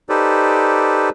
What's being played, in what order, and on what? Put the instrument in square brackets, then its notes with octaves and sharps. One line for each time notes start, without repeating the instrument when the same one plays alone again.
[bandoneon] D#4 G4 A4 B4 C5 D5